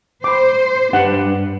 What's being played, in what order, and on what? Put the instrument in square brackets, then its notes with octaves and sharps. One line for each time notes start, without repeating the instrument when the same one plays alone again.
[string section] C5 [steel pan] B5 D6
[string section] G2 [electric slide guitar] D4 G4 B4 [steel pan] F#5